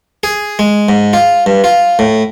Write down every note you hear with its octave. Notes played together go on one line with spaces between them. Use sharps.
G#4
G#3
G#2
F4
G2
F4
A2